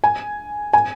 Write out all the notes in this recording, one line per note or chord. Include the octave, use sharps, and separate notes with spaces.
G#5
G#5